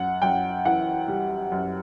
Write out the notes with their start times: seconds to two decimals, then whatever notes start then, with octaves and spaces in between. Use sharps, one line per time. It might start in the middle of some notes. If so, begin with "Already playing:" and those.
Already playing: F#2 F#5
0.22 F#2 G5
0.65 E3 F#5
1.08 G3
1.52 F#2